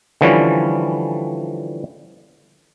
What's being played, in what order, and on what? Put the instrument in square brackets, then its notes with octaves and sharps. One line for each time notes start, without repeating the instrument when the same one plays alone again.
[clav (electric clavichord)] D3 E3 F3 G3 C#4